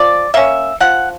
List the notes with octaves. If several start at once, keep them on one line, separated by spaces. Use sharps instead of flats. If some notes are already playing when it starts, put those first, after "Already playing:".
Already playing: F3 D5
A#3 C#4 E5
F3 F#5